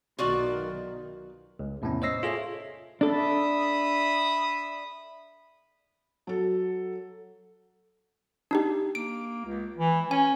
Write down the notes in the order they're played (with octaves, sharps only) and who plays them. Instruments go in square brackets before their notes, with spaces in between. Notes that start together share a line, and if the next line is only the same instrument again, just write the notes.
[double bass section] B1 D#3 [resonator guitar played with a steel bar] F4 F#4 D5
[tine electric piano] C#2
E2 A2 C3 B3 C#4
C5 C#5 D#5 E6 A#6 C7
F4 G#4 A4 C#5 E5
[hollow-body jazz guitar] D4 A4 [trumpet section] E5 B5 D#6
[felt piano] F#3 A4
[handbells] D4 D#4 G4
[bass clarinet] A#3 [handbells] D7
[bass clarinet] C#2
E3
[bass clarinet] C#4 [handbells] G#5